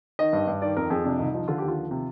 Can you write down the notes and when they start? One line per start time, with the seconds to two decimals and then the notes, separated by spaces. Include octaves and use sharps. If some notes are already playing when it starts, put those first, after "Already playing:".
0.19 D#3 D#5
0.33 G2
0.47 G2
0.62 D#3 D5
0.77 F2 A#4
0.90 F2 G#4
1.05 C3 D4
1.19 C2 D#4
1.34 F3 D#4
1.48 D3 F4
1.58 D#2 G4
1.68 F4
1.77 F3
1.91 C3